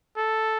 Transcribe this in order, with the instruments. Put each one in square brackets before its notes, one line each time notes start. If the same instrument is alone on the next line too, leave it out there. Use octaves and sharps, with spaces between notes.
[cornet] A4